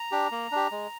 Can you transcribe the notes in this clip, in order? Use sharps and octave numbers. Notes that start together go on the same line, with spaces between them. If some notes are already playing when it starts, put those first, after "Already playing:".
Already playing: A#5
D4 G4
A#3
D4 G4
G#3